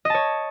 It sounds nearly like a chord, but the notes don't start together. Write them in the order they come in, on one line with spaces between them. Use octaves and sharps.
D#5 A5 C#5